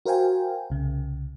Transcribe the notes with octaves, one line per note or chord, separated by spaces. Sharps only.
F#4 A#4 C5 F5 G5 G#5
C2 C#3